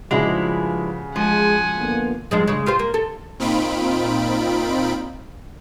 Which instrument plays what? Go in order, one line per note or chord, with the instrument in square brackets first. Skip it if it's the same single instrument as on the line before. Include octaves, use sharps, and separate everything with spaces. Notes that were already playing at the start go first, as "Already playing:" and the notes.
[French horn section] G2 F3 [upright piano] C#3 F#4 F7 [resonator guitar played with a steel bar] G#3 D4 E4
[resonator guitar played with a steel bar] F3 [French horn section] G#3 [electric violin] F#5 G#5
[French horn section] D3 A#3 B3
[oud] G2 F3 G#3
C#3 G#3
F4 G4 C5
A#3
A4
[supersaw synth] A#2 C4 D#4 F4 B5 D7